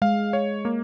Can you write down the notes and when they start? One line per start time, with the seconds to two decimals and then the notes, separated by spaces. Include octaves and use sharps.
0.02 G#3 F5
0.33 C#5
0.65 A#3